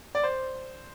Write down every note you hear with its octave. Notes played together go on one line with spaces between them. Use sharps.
D5
C5